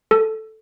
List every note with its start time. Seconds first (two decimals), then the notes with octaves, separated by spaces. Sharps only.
0.11 A4